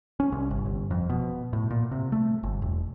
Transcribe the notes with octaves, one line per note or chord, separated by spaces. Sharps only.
C#4
C2
G1
G1
F2
B2
A2
A#2
C3
A3
G1
E1